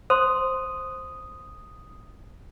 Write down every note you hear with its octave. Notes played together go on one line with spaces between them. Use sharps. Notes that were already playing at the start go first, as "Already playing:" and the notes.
C5 C6 D#6